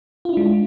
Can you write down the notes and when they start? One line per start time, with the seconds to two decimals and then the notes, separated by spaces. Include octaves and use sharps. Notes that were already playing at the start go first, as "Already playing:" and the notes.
0.25 F4
0.29 E4
0.33 D4
0.37 G#3